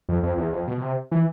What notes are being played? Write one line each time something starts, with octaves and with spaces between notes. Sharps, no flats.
F2
F2
E2
F2
B2
B2
C3
E3